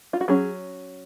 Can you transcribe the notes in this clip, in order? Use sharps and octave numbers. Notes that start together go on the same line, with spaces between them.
F4
F#4
F#3 C#4 G#4